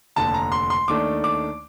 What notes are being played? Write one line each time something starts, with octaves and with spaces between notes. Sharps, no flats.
F1 D#2 D3 A5
A#5
C6
C6
D#2 D#3 A3 D4 D6
D6